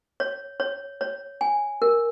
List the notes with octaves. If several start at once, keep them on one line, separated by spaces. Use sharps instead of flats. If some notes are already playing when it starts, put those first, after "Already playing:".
C#5
C#5
C#5
G#5
A#4